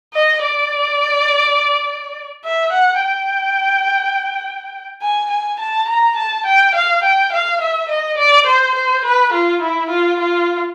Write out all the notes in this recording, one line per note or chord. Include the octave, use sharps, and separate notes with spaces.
D#5
D5
E5
F#5
G5
G#5
G#5
A5
A#5
A5
G5
F5
G5
F5
E5
D#5
D5
C5
C5
B4
F4
E4
F4
F4